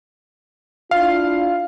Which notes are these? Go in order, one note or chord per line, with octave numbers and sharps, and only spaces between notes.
D4 E4 F4 F5